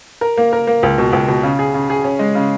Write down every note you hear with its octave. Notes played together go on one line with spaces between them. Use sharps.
A#4
A#3
A#4
A#3
C#2
B2
C#2
B2
C#3
G#4
C#3
G#4
C#4
G#3
C#3